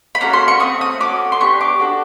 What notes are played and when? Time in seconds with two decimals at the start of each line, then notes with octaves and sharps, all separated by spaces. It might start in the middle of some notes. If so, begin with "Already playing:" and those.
0.15 B5
0.20 A#3 C#4 F#4 A4 A#5
0.33 C6
0.48 C#6
0.60 A3 C4 D#6
0.81 D#6
1.00 C#4 F#4 A4 D6
1.32 C6
1.40 B3 D4 G4 C#6
1.61 D6
1.80 D4 F#4 A4